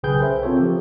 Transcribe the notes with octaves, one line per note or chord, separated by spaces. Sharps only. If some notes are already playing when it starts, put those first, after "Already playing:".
B1 C#3 G#4 B4 G5 G6
A#4 C5 E5
C4 F4 A4 C#5
F3 G4